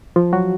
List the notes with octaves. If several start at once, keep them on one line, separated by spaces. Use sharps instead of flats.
F3 F4
F#3 F#4